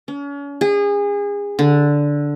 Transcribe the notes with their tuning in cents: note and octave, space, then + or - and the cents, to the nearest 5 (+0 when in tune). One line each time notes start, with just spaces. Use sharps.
C#4 +40
G#4 -30
D3 -5